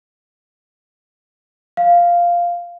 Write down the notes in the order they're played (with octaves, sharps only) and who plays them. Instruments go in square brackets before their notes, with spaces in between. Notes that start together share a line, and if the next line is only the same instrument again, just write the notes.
[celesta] F5